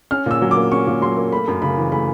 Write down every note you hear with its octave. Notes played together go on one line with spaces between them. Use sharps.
C#4 F6
A#2 E6
F#3
D6
A#3
C#4 C#6
A#2
F#3 C6
A#3
A3 B5
F#2
C#3 B5
E3
A3 B5